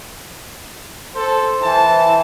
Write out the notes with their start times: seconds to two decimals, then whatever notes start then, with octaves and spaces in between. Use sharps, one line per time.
1.15 A4 C5
1.63 E3 A5